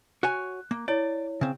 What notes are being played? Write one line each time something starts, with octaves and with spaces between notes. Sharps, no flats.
F#4 C#5 G#5 F#6
A#3
E4 C#5 D5
C#3 C4